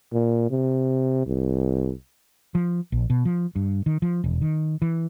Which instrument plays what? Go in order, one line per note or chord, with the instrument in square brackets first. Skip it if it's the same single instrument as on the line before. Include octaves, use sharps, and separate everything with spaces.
[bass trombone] A#2
C3
C2
[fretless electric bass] F3
A#1
B2
F3
G2
D#3
F3
E1
D#3
E3